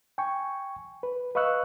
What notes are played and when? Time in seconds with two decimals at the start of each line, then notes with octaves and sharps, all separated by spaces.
0.18 G5 G#5 C#6
1.03 B4
1.35 B4 D#5 F5 C#6 E6 F#6